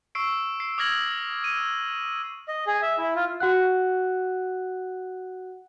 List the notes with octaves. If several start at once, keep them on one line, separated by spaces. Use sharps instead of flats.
C#6 E6 C7 D7
C7
D6 D#6 F6 G#6 A#6 F#7
E6 D#7
D#5
G#4
E5
E4
F4
F#4 F#5 F#6